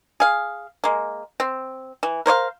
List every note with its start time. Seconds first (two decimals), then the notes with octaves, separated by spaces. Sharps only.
0.20 G#4 F5
0.84 G#3 A#3
1.40 C4
2.03 E3
2.26 A#4 C5 C#5 F5